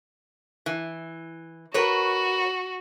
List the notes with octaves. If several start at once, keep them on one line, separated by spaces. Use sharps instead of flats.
E3
F#4 A#4 B4 C#5